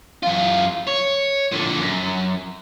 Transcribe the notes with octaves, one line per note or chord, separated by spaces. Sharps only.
F#2 F4
C#5
A#2 D3
F#2